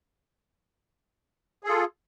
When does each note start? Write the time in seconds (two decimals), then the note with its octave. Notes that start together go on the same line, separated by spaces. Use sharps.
1.64 G#4
1.66 A4
1.69 F4